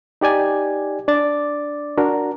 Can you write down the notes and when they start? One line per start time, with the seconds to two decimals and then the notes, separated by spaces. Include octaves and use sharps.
0.21 D#4 G4 D5 G#5
1.08 D4 D5 D6 A6
1.97 D4 F#4 A#4